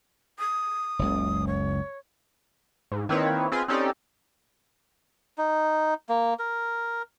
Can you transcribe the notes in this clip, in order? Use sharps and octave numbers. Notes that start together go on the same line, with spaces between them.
D#6
F#1 C#2
C#5
G#2
D#3 A#3 C4 E4 B4 C#5
C4 F4 G#4 B4 D#5 G#5
C4 C#4 D#4 G4 A4 D5
D#4
A#3
A#4